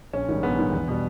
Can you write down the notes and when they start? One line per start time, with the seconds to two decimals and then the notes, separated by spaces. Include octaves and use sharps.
0.13 A#1 C#4
0.28 G#2 D#3 G3
0.43 A#1 B3
0.58 G#2 D#3 G3
0.73 E2
0.88 B2 G3